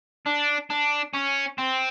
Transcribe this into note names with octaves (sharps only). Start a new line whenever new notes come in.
D4
D4
C#4
C4